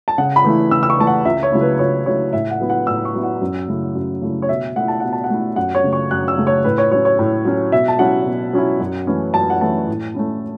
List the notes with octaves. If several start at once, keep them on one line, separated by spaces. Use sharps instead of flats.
A5
C#3 F#5
B5
E3 A3 E4
C#3 E6
E6
C#6
E3 A3 E4 A5
F#5
C#2 E5
C#5
C#3 F#3 A3 E4
B4
C#2 C#5
C#3 F#3 A3 E4 C#5
A2 E5
F#5
F#3 B3 E4
F#5
A2 E6
C#6
F#3 B3 E4
F#5
F#2
C#3 A3 E4
F#2
C#3 A3 E4
C#5
B2 E5
A3 E4 F#5
A5
B2 F#5
A5
F#5
A3 E4
F#2 F#5
C#5
C#3 A3
C#6
F#2 F#6
E6
C#3 A3
C#5
A2 B4
C#5
F#3 C#4 C#5
C#5
A2
F#3 C#4
B2 E5
A5
F#3 C#4 E4 F#5
B2
F#3 C#4 E4
F#2
E3 A3 C#4 E4
F#2 A5
F#5
E3 A3 C#4 E4 A5
A2
A3 C#4 E4